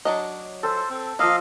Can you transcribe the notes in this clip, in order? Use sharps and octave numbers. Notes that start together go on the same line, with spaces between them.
F#3 D4 D#5
A4 C5 E5
C4
F3 A#3 D#5 F5 D#6 E6